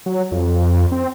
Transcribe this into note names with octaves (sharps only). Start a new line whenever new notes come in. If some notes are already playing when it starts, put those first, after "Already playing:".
F#3
F2
C4